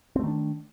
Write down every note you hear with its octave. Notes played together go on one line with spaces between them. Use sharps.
D#3 A3 C4 D4